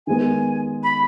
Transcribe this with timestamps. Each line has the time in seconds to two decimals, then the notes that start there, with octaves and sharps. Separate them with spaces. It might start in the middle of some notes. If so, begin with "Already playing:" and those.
0.07 D#3 G#3 B3 G#5
0.83 B5